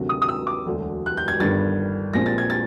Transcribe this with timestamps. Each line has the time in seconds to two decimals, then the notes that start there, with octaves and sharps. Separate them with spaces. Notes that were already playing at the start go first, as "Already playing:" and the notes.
Already playing: D2 C3 D#3 F#3
0.09 D#6
0.22 D#6
0.28 E6
0.47 D6
0.65 E1 D2 D3 F#3
1.06 F#6
1.17 G6
1.28 G#6
1.40 G1 G2 D#3 G3 A6
2.13 A#1 A#2 F3 G#3 C4 A#6
2.26 A6
2.38 G#6
2.50 A6